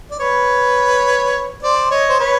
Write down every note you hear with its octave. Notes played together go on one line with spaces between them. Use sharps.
D5
B4 C#5
C5 D5
C#5 D#5
C5
B4 C#5